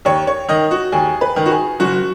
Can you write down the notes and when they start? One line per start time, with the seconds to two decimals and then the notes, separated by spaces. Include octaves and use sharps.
0.05 D#2 C#5
0.27 C#5
0.49 D#3 D#5
0.71 F#4
0.92 D#2 G#4
1.21 B4
1.36 D#3
1.46 F#4
1.51 G#4
1.80 F#1 F#4